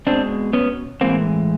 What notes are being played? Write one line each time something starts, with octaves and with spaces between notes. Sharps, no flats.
B2 G#3 C4 D4
B3 C#4
A2 E3 G#3 A#3 C4